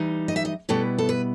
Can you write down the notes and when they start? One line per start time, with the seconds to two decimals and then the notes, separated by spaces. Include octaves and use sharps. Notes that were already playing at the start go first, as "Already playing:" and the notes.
Already playing: E3 G3 D#4
0.28 D#5
0.36 E5
0.45 D#5
0.69 B2 G3 B3 E4 A4
0.98 A4
1.09 B4